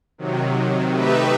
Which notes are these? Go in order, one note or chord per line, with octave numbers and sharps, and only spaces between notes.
C3 D#3 F#3
A3 D#4 G4 B4 E5